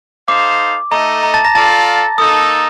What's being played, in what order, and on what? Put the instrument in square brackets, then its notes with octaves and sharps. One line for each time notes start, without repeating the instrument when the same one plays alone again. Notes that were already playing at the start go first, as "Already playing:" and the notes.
[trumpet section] D#4 A4 C5 F5 [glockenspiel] D6
[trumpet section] A3 D#4 A4 D#5 [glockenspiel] A#5
[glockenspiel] A#5
A5 A6
A#5 A#6
[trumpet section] F4 A4 D5 F5 [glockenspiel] A5 A6
[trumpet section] A#3 D#4 A4 [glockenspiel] D#6